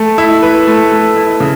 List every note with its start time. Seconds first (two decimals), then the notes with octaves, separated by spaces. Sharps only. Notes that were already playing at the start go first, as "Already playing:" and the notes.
Already playing: A3
0.18 E4
0.42 B4
0.67 A3
0.92 A3
1.17 E4
1.40 C#3